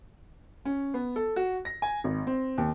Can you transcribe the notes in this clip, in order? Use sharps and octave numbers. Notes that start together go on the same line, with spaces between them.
C#4
B3
A4
F#4
A#6
G#5
G#1
C4
D#2